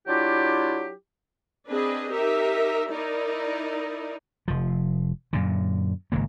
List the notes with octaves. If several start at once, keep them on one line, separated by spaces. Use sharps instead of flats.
F#3 D4 E4 F4 G4
C4 D4 G#4 B4 D#5
D#4 G4 A#4 E5
D#4 E4 A#4 D5
F1 F3
F#2 A#2 D3
G#1 G#2 C#3 A#3